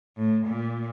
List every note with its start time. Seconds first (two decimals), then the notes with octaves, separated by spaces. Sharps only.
0.18 A2
0.46 A#2